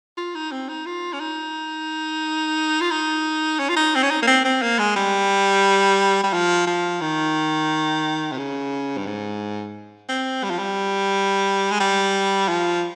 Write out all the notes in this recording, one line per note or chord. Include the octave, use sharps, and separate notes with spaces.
F4
D#4
C4
D#4
F4
C#4
D#4
F4
D#4
C#4
F4
D#4
C4
C#4
D#4
A#3
C4
C4
A#3
G#3
G3
G3
F3
F3
D#3
C3
C#3
G2
G#2
C4
G3
F3
G3
G#3
G3
F3